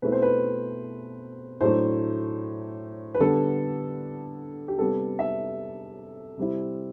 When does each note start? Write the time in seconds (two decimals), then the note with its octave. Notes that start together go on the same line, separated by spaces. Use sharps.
0.02 B2 A3 C4 E4 B4
0.12 C5
0.22 B4
1.61 A2 F#3 A3 D4 C5
3.14 B4
3.20 D3 G3 B3 D4 A4
4.68 G4
4.79 C3 G3 B3 A4
5.19 E5
6.37 C3 G3 C4 E4